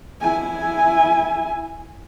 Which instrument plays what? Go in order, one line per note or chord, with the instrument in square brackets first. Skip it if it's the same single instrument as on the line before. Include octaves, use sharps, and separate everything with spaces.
[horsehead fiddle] E4 G#5